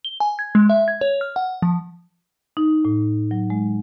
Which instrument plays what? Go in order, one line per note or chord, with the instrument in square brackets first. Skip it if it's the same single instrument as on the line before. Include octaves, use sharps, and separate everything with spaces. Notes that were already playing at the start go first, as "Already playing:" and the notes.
[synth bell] G7
G#5
G#6
G#3
E5
G#6
C#5
F6
F#5
F3
[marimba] D#4
A2
F#3
G#3